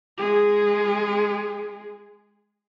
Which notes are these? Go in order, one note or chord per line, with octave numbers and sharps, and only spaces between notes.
G#3 G#4